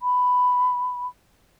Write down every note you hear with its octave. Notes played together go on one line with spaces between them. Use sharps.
B5